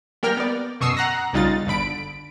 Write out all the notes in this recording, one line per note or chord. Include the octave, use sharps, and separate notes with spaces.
G3 A#3 A#4 G5 F6
B3 D5
F#2 B2 C#6 D#6 E6 C7
F#5 A#5 F#6 A#6
B1 C#3 G3 D#4 F4 A6
G1 D3 B5 D7